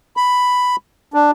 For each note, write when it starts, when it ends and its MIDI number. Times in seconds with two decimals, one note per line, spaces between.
0.17 0.76 83
1.14 1.31 62